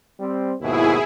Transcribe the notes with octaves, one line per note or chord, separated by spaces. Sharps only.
G3 C4
D#2 G#2 B2 E4 G#4